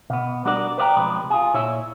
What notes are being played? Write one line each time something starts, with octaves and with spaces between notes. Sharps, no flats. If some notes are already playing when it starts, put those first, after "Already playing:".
B2 B3
G3 D4 F#4 A#4 D5
B4 C5 D5 F5 G5 A#5
B1 C3 F3 G#3 B4
F4 G#4
A#2 E4 C#5 E5